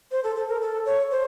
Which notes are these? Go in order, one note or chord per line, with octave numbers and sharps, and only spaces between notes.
C5
A4
A4
A#4
A4
C#5
C5